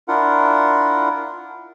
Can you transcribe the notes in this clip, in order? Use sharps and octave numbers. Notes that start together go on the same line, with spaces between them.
D4 E4 F4 A#4 F#5